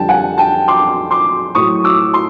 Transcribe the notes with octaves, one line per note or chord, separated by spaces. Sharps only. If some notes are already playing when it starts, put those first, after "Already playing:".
Already playing: F2 D3 G3 G5 A5
F#5 G#5
G5 A5
C6 D6
C6 D6
A2 F#3 C#6 D#6
D6 E6
C6